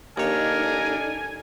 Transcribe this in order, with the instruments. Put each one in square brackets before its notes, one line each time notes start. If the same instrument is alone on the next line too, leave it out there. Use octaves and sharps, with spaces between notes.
[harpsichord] D#2 C#5 [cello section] D4 D#4 A4 [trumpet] A#4 [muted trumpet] G#5